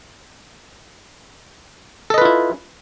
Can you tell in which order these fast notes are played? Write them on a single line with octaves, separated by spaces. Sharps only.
A4 D#5 B4 F4 E4